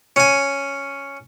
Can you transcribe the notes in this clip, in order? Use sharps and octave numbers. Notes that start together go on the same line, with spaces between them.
C#4 G#5